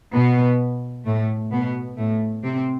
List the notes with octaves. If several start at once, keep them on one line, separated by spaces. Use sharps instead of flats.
B2 B3
A2 A3
B2 B3
A2 A3
C3 C4